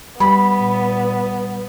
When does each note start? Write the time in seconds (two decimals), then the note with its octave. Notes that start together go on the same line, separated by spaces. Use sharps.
0.20 G3 B3 B5
0.57 A#2